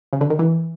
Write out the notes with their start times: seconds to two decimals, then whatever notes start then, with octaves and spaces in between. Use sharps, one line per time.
0.13 C#3
0.21 D3
0.30 D#3
0.39 E3